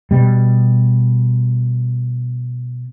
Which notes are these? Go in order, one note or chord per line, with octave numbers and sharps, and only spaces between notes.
B2 G3